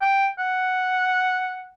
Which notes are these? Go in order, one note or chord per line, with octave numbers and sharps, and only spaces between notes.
G5
F#5